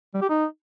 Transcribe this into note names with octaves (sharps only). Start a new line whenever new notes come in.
G3
G4
D#4